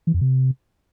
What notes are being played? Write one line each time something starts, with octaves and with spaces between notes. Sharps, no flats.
E3
F2
C3